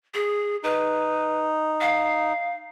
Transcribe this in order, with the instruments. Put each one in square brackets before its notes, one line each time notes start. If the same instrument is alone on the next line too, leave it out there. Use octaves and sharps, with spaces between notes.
[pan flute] G#4
[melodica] D#4 [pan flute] B4
[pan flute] F5